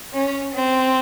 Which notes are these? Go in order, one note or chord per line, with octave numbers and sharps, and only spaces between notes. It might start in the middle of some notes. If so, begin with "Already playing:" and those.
C#4
C4